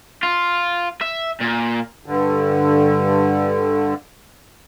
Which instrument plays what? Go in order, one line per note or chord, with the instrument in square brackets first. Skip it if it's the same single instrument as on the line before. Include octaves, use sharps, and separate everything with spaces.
[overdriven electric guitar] F4
E5
A#2
[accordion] G2 D3